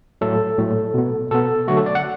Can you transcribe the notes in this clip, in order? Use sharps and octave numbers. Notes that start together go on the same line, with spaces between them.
A2 F#3 A3 A4
A2 F#3 A3
B2 B3
B2 B3 A4
D3 F#3 A3 F#4
A4
D5
F#5